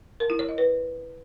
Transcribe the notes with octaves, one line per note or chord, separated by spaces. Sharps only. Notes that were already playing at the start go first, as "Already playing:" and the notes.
A#4
E4
C#5
D#5
B4